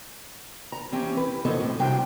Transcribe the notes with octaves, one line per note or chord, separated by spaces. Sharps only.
A#5
E3 C4 C#4 G4
B4
E2 F3 C4 A4 C#5 D#5
A2
C3 F#3 G3 D4 G5